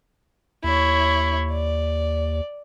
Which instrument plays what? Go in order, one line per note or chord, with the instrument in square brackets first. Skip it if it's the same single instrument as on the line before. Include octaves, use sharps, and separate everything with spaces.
[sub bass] D#2 [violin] E4 C#5
[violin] D5